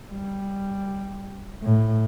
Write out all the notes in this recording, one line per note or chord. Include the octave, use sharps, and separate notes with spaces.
G3
A2